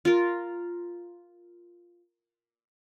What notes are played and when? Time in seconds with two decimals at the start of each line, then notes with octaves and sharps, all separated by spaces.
0.05 F4 A#4